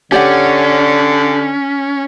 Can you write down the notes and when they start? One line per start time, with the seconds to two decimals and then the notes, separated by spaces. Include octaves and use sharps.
0.12 D3 C#4 G4 D5 F#5